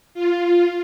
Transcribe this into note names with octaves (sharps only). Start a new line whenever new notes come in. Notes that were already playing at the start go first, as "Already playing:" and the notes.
F4